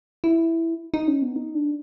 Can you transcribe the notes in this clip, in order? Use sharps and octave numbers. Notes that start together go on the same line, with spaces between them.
E4
D#4
C#4
B3
D#4
D4